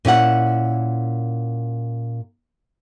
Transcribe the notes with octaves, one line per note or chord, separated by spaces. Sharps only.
A#2 C#4 E4 F#5